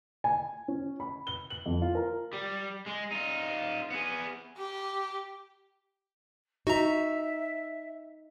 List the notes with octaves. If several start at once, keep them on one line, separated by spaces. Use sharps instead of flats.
G#5
C#4
B5
G7
F#7
F2
F4
A#4
G3
G#3
D#4 F4
B3 G#4
G4
D#4 F#4 E5 A#5